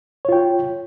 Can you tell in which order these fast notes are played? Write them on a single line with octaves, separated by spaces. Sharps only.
C#5 F4 G5